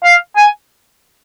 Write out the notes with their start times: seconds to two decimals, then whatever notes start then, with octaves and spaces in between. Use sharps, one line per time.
0.04 F5
0.36 G#5